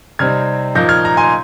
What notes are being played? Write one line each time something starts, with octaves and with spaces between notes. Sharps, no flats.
C3 G3 C4 D#4 F6 G#6
A#2 F3 A#3 D#4 G6 A#6
F6 G#6
A#5
G#5 C6